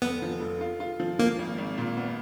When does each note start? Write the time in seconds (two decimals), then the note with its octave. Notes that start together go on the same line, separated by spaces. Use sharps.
0.02 F1 B3
0.22 F3
0.40 F1
0.61 F4
0.80 F4
1.00 F3
1.19 F3 A#3
1.39 G#1
1.58 G#1
1.78 A#2
1.97 B3